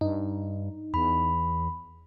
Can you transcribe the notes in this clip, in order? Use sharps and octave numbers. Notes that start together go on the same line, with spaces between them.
G2 D#4
E2 B5